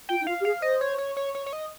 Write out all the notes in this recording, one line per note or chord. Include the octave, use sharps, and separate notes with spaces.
F4 G5
D#4
F4 F5
G4
G#4 F5
C5 D#5
C#5
C#5
C#5
C#5
C#5
D#5